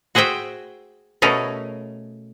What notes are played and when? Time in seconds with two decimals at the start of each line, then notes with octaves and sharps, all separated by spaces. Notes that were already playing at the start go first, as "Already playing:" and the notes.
0.15 F#4 G#4 C5 E5 G5
1.22 B2 A3 C#4 G#4 A#4